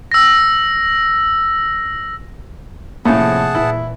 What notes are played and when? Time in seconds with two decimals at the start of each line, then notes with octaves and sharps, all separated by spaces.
0.12 E6 A#6
3.05 F2 A2 C3 A#3 C#4 G#4 F#5 A5
3.55 A#2 E3 E4